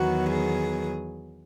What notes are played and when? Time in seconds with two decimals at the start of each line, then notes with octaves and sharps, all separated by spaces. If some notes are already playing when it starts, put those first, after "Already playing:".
Already playing: E2 D#3 F#3 B3 F#4
0.30 G#4